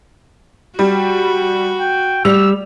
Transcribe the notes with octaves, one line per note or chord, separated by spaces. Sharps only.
G3 F#4
G5
G3 E6 F7